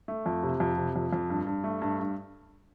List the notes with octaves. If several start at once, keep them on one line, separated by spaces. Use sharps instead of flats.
A3
F2
C3
F2
C3
F2
F2
G2
G2
A3
G2
G2